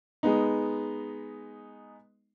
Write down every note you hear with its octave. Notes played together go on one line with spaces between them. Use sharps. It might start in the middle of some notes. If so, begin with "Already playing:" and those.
G#3 B3 D#4